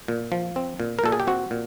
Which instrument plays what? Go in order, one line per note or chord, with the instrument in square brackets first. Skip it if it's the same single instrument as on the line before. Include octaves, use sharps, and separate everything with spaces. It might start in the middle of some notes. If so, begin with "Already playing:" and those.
[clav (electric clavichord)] A#2
F3
C4
A#2
A#4
A#2 A4
G#4
G4
C4 F#4
A#2